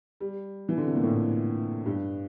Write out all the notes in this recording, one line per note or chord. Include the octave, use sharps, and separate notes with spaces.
G3
E3
D3
C3
A#2
A2
G2